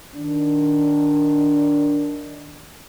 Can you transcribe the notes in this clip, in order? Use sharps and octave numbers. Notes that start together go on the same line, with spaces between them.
D#3 D4